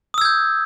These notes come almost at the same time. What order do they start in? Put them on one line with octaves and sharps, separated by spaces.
D#6 E6 G#6 G6